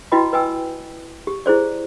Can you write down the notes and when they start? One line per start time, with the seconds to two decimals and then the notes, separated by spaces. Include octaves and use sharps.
0.12 E4 F#4 B4 D#5 G5 B5
0.33 B4 D#5 G5 G#5 E6
1.27 G4
1.46 E4 G#4 C5 D5